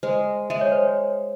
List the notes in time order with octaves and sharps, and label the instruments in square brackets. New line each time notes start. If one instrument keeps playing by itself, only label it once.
[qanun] G#3 [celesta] C5
[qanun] G#3 [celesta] E5
[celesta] C#5
C5
C#5